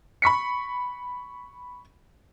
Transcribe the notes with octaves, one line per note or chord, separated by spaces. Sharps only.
B5 C#6 B6 C#7